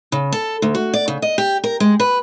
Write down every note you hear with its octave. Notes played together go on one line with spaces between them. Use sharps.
C#3
A4
D2
F#4
D5
C#3
D#5
G4
A#4
G#3
B4